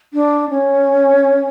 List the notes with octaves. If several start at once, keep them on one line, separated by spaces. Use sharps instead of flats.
D4
C#4